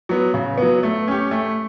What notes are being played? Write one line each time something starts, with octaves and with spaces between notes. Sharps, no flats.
F#3 B3
C#3
F#3 B3
A3
C#4 G4
A3